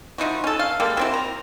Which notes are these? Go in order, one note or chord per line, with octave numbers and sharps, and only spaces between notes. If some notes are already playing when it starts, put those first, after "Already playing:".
F3 D#4 E4 F#4
C#4 A4
F5
G3 G#3 A#3 A4
F#3 C4 E4
A#5